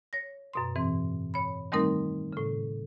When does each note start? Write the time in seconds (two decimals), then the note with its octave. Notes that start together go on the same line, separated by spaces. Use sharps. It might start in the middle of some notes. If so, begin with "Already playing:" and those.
0.13 C#5 A#6
0.53 F#2 B2 C6
0.76 G#2 E3 C4
1.34 C#5 B5
1.72 D#3 G3 A3 C4 D#4 A#4
2.33 A2 C#3